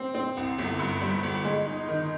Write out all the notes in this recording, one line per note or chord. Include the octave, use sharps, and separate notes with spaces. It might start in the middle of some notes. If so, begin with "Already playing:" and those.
Already playing: C4
C4
C2
G1
G2
G3
G1
G#3
D#4
D#3